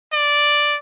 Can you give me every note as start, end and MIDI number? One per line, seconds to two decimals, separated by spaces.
0.13 0.76 74